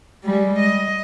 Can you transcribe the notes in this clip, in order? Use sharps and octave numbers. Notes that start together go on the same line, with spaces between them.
G3 G#3
D#5